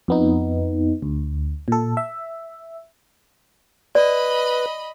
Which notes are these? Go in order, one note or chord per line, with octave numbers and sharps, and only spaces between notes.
F2 B3 D#4
D2
A#2 A4
E5
B4 D5 D#5 B5